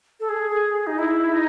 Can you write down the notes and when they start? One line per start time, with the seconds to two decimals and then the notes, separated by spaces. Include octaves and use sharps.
0.20 A4
0.29 G#4
0.87 D#4
0.98 E4
1.33 D#4